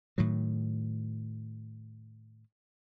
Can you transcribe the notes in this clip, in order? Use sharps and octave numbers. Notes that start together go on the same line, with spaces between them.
A2 D#3 F#3